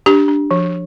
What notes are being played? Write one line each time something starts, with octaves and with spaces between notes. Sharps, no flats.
D4 G4
D4
F3